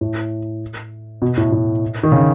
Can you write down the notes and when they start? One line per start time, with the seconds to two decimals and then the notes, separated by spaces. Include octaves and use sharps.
0.01 A2
1.22 B2
1.37 A2
1.52 A2
2.03 D#3
2.12 C#3